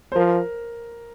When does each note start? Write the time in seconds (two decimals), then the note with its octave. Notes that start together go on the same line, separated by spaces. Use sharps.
0.12 C5
0.16 F3 A#4